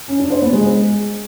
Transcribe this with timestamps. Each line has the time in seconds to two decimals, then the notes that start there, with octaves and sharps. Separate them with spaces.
0.08 C#4
0.19 D4
0.30 C5
0.42 B3
0.53 G#3